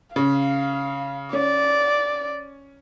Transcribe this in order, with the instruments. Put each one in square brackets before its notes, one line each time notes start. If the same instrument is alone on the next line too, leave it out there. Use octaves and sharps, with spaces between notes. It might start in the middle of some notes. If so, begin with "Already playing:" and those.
[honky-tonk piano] C#3 [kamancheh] F5
[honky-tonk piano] C#4 [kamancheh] D5